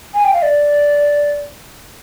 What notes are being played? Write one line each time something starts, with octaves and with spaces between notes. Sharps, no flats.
G#5
G5
F5
D5